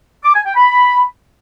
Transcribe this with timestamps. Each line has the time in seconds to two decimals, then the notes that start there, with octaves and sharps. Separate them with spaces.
0.24 D6
0.35 G#5
0.45 G5
0.56 B5